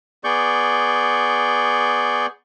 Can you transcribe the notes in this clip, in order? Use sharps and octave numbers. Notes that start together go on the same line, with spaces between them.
B3 G#4 D5 C#6 G6